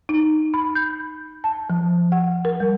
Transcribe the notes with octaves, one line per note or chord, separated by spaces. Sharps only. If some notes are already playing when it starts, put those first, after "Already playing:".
D#4
B5
G6
A5
F3
F#5
A#4
G3